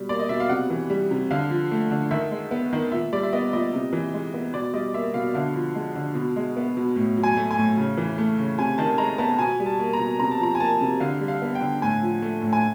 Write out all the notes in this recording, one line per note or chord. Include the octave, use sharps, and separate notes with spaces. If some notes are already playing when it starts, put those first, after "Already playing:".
Already playing: B2 G3
A#3 D5
D#5
B2 E5
F5
C3 F#5
E3
G3
C3
D3 F5
F3
A3
D3
D#3 E5
G#3
B3
D#3
A#2 E5
G3 D5
E5
B3 D#5
A#2 D#5
C3
E3
G#3
B3
B2 D5
G3 D#5
A#3 E5
B2 F5
D3 F5
F3
G#3
D3
B2
G#3
B3
B2
A2
F#3
G#5
A3
G#5
A2
C#3
E3
A3
C#3
C3 G#5
D#3 A5
G#3 A#5
B3 A5
B2 G#5
G3
A5
A#3
A#5
B2
C3 A#5
A5
F3 A#5
G#5
A#3 A5
C3
D3 F5
G3
F5
B3
G5
D3
A2 G#5
F3
A3
A2
G#5